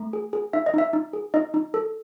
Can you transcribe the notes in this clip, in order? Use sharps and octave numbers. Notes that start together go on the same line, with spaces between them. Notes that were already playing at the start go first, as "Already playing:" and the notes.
Already playing: A3
G#4
G#4
D#4 E5
D#5
D#4 E5
D#4
G#4
D#4 D#5
D#4
A4